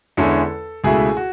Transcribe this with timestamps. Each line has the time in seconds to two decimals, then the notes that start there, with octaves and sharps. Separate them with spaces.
0.17 E2 D3 G#3 C#4 E4 A4
0.84 C#2 B2 A3 E4 G#4
1.17 F#4